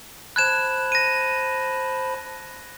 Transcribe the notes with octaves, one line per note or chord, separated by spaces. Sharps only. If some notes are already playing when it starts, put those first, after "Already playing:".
C5 A5 B5 F#6 G#6 E7
A#6 D#7